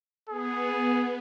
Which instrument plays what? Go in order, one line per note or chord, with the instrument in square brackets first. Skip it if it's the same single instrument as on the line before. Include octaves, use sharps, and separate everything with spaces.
[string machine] B3 [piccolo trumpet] G#4